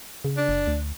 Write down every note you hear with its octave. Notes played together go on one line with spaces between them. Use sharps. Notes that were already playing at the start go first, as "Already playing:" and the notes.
C#3
D4
F#1
D2